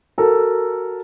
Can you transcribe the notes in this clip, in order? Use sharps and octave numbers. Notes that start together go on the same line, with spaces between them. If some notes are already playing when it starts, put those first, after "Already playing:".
F#4 A4 A#4